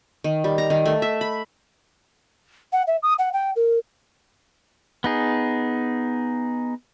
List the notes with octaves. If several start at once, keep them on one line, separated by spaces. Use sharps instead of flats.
D#3
G3
A#5
D#3
A3
E5
B5
F#5
E5
D#6
F#5
G5
A#4
B3 D#4 G#4